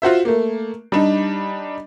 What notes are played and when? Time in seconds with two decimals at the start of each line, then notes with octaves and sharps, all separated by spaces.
0.02 F4 F#4 C5 E5
0.25 A3 A#3
0.92 G3 D4 D#4